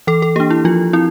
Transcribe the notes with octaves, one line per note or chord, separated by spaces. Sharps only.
E3 A4
A4
A#3 D4 G4
E4
F3 F4
C4 E4